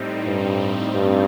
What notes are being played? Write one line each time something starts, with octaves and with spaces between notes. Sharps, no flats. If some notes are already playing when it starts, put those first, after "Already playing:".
Already playing: A2 G3 C4 D#4
G2
G2